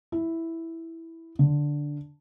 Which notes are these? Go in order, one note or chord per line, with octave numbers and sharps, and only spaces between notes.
E4
D3